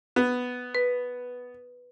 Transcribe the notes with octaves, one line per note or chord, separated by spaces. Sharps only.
B3
B4